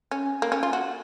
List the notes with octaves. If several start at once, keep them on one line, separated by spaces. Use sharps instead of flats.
C#4
A#3
C#4
F4
F#4